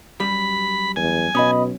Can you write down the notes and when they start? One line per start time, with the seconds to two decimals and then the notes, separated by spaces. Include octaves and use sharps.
0.20 F#2 G3 B5
0.96 E2 G#5
1.35 B1 B2 C#4 D#5 B5 D#6